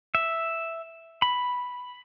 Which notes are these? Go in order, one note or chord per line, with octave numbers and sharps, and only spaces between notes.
E5
B5